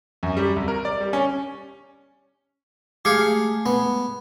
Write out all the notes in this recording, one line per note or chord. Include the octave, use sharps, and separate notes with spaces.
F#2
G3
C2
A#4
D5
G3
C#4
G#3 A3 G4 G#4 F5
B3